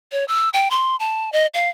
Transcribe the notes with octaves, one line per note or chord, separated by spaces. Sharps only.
C#5
E6
G5
C6
A5
D#5
F5